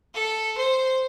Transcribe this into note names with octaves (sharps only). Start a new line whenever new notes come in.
A4
C5